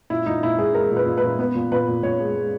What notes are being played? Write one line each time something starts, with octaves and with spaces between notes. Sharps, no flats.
A#2 E4
A#2 D#4
A#2 E4
A#2 G#4
G#3 A#4
A#2
B4
A#2
B4
A#2
B3 B4
A#2
A#2 B4
A#2
A#2 C#5
G#3
G#3